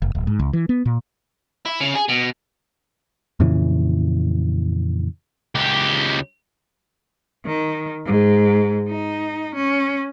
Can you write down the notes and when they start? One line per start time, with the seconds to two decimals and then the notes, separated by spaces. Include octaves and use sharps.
0.02 F#1
0.15 D1
0.27 G#2
0.39 C#2
0.53 E3
0.69 B3
0.86 A#2
1.66 E4
1.80 C#3
1.95 G#4
2.08 B2
3.40 F2 A#2 C#3 E3
5.55 C#2 G4
7.46 D#3
8.06 G#2
8.89 D#4
9.55 C#4